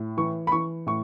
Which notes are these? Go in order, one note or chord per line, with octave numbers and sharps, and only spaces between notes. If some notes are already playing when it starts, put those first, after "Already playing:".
Already playing: A2
E3 C#6
B5
E3 C#6
A2 C#6